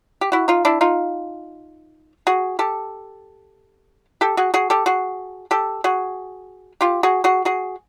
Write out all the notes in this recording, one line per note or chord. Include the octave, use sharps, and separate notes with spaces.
G4
E4 F#4
D#4 F4
D4 E4
D#4 F4
F#4 G#4
G4 A4
G4 A4
F#4 G#4
F#4 G#4
G4 A4
F#4 G#4
G4 A4
F#4 G#4
F4 G4
F#4 G#4
F#4 G#4
F#4 G#4